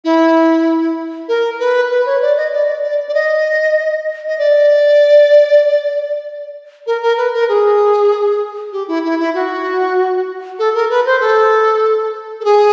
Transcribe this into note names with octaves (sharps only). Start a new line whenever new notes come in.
E4
A#4
B4
B4
C#5
D5
D#5
D5
D5
D5
D5
D#5
D#5
D5
A#4
A#4
B4
A#4
G#4
G4
E4
E4
E4
F#4
A4
A#4
B4
C5
A4
A4
G#4